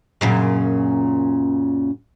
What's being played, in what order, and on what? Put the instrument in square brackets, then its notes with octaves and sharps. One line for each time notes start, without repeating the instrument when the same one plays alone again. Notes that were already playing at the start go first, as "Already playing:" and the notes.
[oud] F#2 A#2 C#3